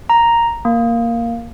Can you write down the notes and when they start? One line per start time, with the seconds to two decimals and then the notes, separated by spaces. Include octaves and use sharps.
0.10 A#5
0.65 A#3